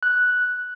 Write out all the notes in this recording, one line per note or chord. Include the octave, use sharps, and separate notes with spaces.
F#6